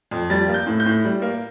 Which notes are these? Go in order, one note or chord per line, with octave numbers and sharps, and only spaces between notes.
F2
G3 A6
A#3
G6
A2
G6
A2
G3
A#3